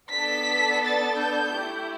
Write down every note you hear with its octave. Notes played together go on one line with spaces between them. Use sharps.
B3 D4 A4 B6
A6
G6
A3 E4 G4